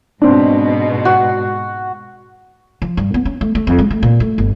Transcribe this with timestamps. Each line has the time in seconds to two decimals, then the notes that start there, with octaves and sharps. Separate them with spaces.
0.22 G#2 B2 C4 D4
1.05 F#4
2.82 F3
2.97 G2
3.14 B3
3.25 C#4
3.41 A3
3.55 A3
3.67 F2
3.79 G#3
3.90 A3
4.03 A#2
4.20 A3
4.38 G1